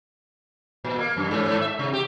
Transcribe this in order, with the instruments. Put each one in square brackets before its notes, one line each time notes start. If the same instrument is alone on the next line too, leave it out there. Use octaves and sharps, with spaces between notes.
[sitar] A#2
A#3
F#2
G#2
G#2
E5
C3
G4